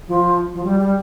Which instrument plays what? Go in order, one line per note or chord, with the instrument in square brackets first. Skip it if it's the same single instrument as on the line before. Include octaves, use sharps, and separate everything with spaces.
[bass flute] F3
F3
G3
G3